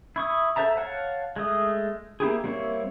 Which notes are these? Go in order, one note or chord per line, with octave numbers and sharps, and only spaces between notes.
E4 C#6 D#6
A4 C5 E5 A5 A#5
C#5 F5 F#5 A5
G#3 A3 D#6
A#3 E4 G4 G#4
G3 A#3 C4 E4 C#5